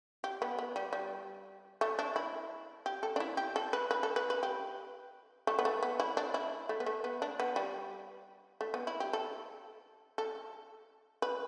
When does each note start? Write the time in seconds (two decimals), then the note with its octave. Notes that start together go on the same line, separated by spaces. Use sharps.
0.24 G4
0.42 B3
0.59 B3
0.76 G3
0.93 G3
1.81 A3
1.99 D4
2.16 E4
2.86 G4
3.03 A4
3.16 D4
3.20 E4
3.37 G4
3.56 A4
3.73 B4
3.91 B4
4.03 A4
4.16 B4
4.30 B4
4.43 G4
5.47 A3
5.59 B3
5.65 A3
5.83 B3
6.00 E4
6.17 D4
6.34 E4
6.69 A3
6.80 B3
6.86 A3
7.04 B3
7.22 D4
7.40 B3
7.56 G3
8.61 A3
8.74 B3
8.87 E4
9.00 G4
9.13 A4
10.18 A4
11.22 B4